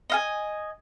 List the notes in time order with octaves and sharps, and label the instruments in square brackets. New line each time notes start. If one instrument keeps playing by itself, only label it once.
[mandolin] D#5 F5 G#5